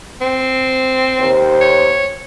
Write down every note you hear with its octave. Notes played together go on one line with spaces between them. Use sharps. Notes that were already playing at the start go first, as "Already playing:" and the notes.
C4
D#2 C5
C#5